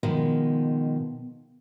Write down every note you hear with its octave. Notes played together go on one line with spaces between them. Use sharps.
B2 D#3 F3 G#3